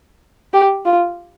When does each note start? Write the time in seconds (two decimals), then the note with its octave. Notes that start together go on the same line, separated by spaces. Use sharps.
0.53 G4
0.85 F4